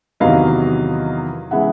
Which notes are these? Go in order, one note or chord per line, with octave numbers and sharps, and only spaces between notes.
E2 C3 D#3 F#3 B3 D#5 F5
C#3 E3 G#3 B3 E5 F#5